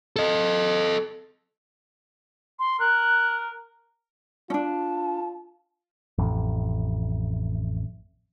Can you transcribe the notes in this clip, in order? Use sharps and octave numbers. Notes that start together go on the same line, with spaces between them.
A4 D#5
C6
A#4 F#6
C#4 D4 F4 A5
A1 F2